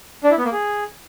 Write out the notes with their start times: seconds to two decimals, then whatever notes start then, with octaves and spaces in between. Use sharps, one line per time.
0.24 D4
0.31 E4
0.38 B3
0.45 A#3
0.52 G#4